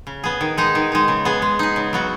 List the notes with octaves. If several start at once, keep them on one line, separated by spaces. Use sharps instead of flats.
C#3
B3 G#4
D#3
G#3 D#4 G#4
D#3
G#3 D#4
C#3
B3 G#4
G#3
D#4 G#4
C#3
F#3 B3 F#4